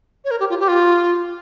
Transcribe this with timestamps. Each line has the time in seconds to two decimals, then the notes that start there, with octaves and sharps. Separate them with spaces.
0.25 C#5
0.31 A#4
0.40 G4
0.50 F4
0.60 G4
0.68 F4